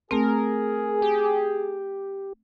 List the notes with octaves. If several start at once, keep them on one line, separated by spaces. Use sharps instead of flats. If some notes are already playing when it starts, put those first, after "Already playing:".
A3 C4 G#4 A#4
G4